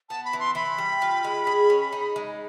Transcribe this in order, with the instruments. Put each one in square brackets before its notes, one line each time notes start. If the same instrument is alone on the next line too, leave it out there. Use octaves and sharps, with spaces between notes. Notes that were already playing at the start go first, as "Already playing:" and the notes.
[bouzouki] B3 [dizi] A5
[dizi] B5
[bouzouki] E3
[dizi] C6
[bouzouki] E3 [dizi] B5
[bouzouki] G3
F4
G#3
G#4
C#4
D#4
G#3